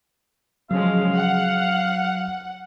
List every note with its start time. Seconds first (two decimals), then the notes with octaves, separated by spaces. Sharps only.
0.71 C#3 F3 F#3 G#3 F5
1.16 F#5